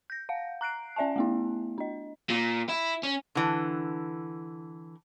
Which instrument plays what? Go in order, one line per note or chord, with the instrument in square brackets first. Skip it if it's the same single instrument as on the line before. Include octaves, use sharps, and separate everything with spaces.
[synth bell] G6 A#6
F5 F#5
A#5 F#6 C7 D7
C#4 D5 E5 G#5 A5
A3 B3 E4
D4 D#5
[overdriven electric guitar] A#2
E4
C#4
[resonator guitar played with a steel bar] D3 E3